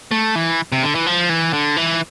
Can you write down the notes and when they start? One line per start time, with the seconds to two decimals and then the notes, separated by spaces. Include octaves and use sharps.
0.11 A3
0.35 E3
0.72 C3
0.83 D3
0.95 E3
1.06 F3
1.29 E3
1.53 D3
1.76 E3